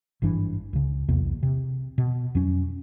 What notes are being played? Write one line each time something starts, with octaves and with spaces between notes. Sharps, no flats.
G#1 G2 E3 D4
C#2 C#3
B1 E2 C3 A#3
C3
B2
F2 F#3 C#4